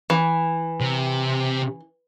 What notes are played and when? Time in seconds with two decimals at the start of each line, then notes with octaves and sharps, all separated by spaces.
0.10 E3
0.81 C3